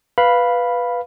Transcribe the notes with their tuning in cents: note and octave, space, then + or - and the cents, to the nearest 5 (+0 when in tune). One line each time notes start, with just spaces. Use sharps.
B4 +0 F5 +0 B5 -5